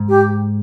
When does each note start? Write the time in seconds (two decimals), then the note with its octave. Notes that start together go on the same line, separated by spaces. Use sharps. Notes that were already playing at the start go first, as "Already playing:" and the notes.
Already playing: G#2
0.09 G4